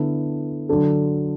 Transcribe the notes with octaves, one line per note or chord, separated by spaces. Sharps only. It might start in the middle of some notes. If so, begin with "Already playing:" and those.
Already playing: D3 B3 E4 A4
D3 F#3 D4 A4